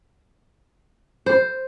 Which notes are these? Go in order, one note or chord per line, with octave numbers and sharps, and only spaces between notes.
C5